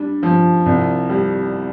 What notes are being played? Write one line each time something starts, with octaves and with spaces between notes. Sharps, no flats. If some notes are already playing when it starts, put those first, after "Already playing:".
Already playing: G3 D4
F3
C2
G3